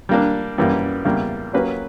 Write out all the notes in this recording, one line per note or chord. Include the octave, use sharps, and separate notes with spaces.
G3 A#3 D4
F#2 E3 G3 A#3
E2 C#3 G3 A#3
F#3 A#3 C#4 G4 B4